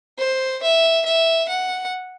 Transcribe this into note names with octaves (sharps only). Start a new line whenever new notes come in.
C5
E5
E5
F#5